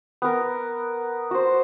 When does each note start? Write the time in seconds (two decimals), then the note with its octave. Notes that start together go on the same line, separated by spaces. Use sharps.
0.22 B3 A#4
1.31 F#4 C5